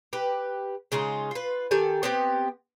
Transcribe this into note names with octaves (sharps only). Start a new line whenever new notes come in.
G4 B4
C#3 G#3 D#4 F4
F4 B4
D#3 G4 A4 G#5
B3 C4 G4